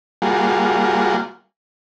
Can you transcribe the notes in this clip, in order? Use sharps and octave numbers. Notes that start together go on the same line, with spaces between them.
G3 A#3 F4 F#4 G#4